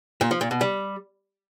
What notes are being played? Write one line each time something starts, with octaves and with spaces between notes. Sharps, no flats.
A#2
F3
A#2
B2
G3